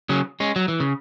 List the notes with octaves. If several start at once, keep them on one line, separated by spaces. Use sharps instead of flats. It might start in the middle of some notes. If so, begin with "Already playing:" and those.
C#3 F#3
G#3 C#4
F#3
E3
C#3